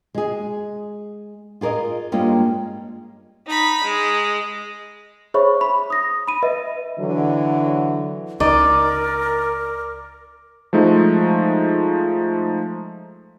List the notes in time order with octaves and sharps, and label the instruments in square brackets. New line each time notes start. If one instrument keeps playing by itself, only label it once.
[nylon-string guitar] G#3 G#4
F4 G#4 A#4 D5 D#5
G2 G#3 A#3 C#4 F4
[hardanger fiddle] D#4 B5
G#3
[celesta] G#4 C5 C#5 E5 B5 C#6
B5
D#6 A#6
B5 D#7
B4 D#5 E5
[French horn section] D3 E3 F#3
[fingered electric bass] C#2 [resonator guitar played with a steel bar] D#4 [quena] A#4 [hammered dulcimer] D5
[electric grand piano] F3 G#3 A3 D#4